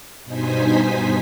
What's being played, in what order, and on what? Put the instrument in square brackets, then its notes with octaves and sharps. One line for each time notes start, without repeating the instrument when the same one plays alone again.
[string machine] G2 B2 D#4 C5 G#5 B6